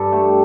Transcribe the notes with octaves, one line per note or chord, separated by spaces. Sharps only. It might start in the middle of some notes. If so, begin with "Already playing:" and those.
Already playing: G2 A4
A3 G4